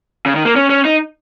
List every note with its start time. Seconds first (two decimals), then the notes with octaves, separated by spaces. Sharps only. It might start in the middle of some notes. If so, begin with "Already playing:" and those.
0.26 C#3
0.35 D#3
0.45 A#3
0.56 C#4
0.70 C#4
0.85 D#4